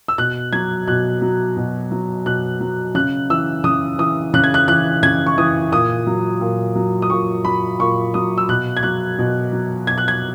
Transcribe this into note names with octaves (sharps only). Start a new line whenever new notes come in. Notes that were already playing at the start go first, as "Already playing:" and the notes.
E6
B2 F#6
F#3 G#6
B2 F#6
F#3
B2
F#3
B2 F#6
F#3
C#3 F#6
E3 E6
C#3 D#6
E3 D#6
C#3 F#6
G#6
F#6
E3 F#6
C#3 G#6
C#6
E3 D#6
A#2 D#6
F#3
A#2
F#3
D#6
A#2 C#6
F#3 B5
A#2 C#6
F#3 D#6
E6
B2 F#6
G#6
F#3 F#6
B2
F#3
B2 G#6
F#6
G#6